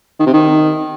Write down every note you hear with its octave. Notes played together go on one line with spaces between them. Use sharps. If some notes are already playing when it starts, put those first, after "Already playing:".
D#3
C3
D#3